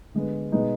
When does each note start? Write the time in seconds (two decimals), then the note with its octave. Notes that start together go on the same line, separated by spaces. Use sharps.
0.14 D3 G#3 B3
0.52 B2 G#3 B3 D#4